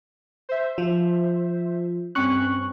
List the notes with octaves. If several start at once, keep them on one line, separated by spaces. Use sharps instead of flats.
C5 E5
F3
G2 C4 C#4 C#6 F#6